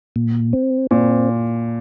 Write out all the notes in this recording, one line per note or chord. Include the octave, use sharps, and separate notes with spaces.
A#2
C4
A#2 C4